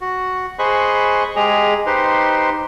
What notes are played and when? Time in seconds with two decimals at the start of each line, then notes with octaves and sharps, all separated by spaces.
0.01 F#4
0.59 G#4 C5 D#5 B5 C#6 F#6
1.36 G#3 G4 G#4 D#5 A#5
1.86 D#4 G4 B4 C5 C6